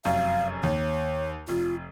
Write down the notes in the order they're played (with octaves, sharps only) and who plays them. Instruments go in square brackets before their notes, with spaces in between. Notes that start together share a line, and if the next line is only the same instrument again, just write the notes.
[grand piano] F1 F#2 [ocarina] F5
[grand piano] D#2 [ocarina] C#5
[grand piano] F1 [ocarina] F4